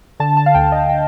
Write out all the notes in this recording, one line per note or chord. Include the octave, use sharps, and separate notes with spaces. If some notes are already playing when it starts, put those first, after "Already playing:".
D3 A5
A5
F5
D2 G5
D#5
G5